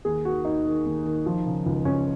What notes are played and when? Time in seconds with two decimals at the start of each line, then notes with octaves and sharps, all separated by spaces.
0.05 D#2 G#4
0.25 D#3 F#4
0.45 D#2 D#4
0.66 D#3
0.86 D#2
1.05 D#3
1.26 F3
1.46 C#3
1.66 C#2
1.85 C#2 C#4